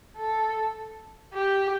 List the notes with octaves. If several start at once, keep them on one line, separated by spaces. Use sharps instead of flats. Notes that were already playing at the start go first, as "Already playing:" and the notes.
A4
G4